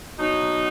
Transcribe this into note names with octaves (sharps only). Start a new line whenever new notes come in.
B2 F#3 D#4